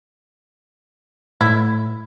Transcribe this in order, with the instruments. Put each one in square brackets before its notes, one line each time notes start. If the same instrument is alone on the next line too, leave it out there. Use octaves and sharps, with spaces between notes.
[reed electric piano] A2 [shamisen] E4